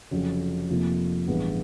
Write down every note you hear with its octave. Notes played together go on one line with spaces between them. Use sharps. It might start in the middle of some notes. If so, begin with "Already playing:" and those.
F1 F2 C#3 F#3
F1 F2 C3 F3 A#3
A1 G2 E3 G#3 B3